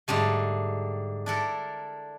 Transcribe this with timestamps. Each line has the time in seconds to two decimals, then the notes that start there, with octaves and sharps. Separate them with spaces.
0.08 G#2 D3 G3 A3
1.26 D4 E4 A4 A#4